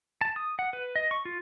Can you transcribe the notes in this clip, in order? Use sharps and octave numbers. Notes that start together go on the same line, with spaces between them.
A5
D#6
F#5
B4
D#5
C#6
F4